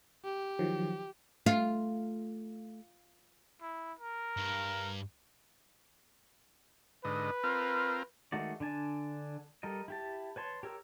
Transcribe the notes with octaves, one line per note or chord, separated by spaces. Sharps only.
G4
D#3 F3 F#3
A3 F4
E4
A#4
G2
G#2 D3 B4 D#5
C4 F4 A#4
D#3 G#3 A3 F#4 D5
D3 D4 G#5 A5
G3 A4 A#4 D#5
E4 G4 A5
B4 C#5 A5 C6
G4 A#4 C#5 E6